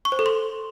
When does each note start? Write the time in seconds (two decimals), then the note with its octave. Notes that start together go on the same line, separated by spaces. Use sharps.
0.05 C#6
0.12 C5
0.19 A4
0.26 C6